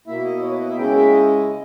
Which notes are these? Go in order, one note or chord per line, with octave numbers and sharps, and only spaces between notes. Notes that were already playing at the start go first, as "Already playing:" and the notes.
B2 A#3 E4 E5
D#5
C#5
B4
D#5
E5
C#3 G#3 C#4 E4 G5
E5
D#5
C#3